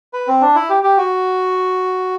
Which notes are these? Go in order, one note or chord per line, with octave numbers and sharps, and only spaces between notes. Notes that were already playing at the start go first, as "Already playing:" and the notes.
B4
C4
D4
E4
G4
G4
F#4